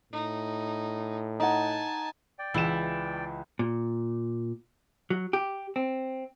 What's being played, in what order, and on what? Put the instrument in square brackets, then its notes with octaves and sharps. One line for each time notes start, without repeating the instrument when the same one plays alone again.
[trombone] A2 [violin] D#4
[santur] D#4 F#5 [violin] G#5 A5
[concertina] D5 G5
[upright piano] C#2 G#3 E7 [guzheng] E3 E4
[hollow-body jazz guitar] A#2
F#3
G4
C4